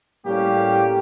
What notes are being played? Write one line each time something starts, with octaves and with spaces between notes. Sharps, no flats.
A2 G3 A#3 C#4 G4